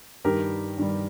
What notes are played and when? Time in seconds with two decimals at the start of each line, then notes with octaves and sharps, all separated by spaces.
0.24 G2 D#3 G3 G4 A#4
0.78 G2 D#3 G3